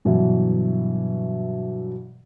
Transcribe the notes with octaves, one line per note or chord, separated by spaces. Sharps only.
G2 B2 E3 F#3 E4